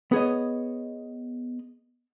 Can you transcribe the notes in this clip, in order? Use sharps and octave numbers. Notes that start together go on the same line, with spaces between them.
B3 G#4 C#5 D#5